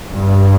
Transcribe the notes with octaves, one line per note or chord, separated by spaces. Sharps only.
G2